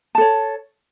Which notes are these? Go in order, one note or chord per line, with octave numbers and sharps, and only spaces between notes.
A4 C#5 A5